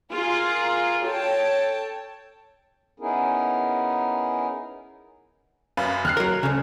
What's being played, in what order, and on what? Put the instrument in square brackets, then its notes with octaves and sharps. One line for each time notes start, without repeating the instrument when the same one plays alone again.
[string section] F4 G#4 A#4
A4 C#5 G5 A5
[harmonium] B3 C#4 D#4 E4 G#4 A#4
[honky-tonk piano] F#2 B4 F5
[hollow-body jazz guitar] D#2 [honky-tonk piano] F6 F#6 C7
[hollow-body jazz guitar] F#3 A#4
D2 C#3